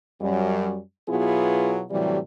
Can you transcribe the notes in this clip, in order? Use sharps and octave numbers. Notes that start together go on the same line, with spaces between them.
F#2 F#3 G3
B2 F#3 B3 E4 F4 G#4
A2 C3 E3 F#3 G3